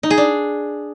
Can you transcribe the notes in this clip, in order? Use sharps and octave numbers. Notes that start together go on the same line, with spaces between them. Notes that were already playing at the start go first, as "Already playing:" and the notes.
D#4
G#4
D4